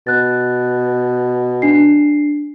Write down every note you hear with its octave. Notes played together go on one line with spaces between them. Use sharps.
B2 F#6 A6
D4 C7